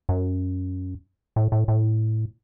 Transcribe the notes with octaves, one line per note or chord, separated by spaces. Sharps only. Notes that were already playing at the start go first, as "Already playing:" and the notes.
F#2
A2
A2
A2